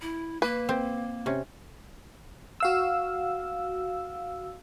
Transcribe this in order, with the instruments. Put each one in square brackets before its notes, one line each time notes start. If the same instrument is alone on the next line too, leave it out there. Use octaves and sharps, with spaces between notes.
[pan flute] E4
[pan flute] A#3 [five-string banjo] B4
[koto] C4
C3 C#4
[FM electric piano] F#4 F5 E6